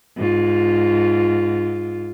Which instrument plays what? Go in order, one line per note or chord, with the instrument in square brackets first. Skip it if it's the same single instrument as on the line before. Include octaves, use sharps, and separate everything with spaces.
[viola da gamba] G#2 F4